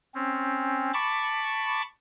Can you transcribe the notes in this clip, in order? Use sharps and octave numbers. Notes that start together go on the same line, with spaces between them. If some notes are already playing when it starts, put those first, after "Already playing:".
C4 C#4
A5 B5 C#6 D6